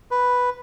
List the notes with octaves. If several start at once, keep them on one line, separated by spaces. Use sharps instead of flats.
B4